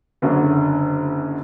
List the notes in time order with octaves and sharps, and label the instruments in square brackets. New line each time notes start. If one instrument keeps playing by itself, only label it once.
[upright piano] F#1 F#2 D3 F#3